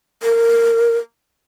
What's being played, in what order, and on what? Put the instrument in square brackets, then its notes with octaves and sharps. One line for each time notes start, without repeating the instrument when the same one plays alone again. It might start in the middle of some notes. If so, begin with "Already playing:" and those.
[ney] A#4